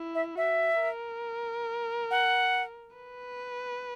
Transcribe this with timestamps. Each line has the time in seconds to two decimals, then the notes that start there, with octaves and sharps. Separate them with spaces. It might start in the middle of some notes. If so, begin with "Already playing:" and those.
Already playing: E4
0.15 E5
0.36 F#4 E5
0.80 A#4
2.11 F#5
2.97 B4